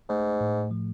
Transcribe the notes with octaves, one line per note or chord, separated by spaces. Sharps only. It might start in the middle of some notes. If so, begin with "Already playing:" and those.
G#2 A3
A2
F3